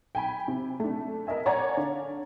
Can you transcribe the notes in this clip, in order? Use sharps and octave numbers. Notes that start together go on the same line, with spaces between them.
G5 G#5 B5
C3
A3 D4
A#4 D#5 E5 G#5
C#5 D5 F#5 G#5 A#5 A6
D3 F5